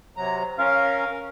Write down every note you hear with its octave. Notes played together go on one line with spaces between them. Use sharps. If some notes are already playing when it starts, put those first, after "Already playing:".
C3 F#3 A#5
C#4 A#4 F5